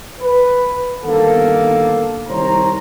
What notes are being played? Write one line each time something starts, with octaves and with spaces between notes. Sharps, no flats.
B4
G1 D#3 A#3 B3 A4
C2 D#3 C5 C#5 A#5